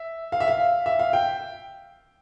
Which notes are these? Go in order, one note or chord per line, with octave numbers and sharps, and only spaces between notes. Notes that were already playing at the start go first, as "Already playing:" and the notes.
Already playing: E5
F5
E5
F5
E5
F5
G5